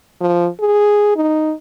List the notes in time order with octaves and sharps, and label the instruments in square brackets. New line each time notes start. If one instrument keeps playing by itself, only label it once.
[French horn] F3
G#4
D#4